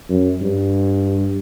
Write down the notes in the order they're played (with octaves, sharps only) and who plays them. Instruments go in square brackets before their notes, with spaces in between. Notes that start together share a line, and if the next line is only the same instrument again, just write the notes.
[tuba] F#2
G2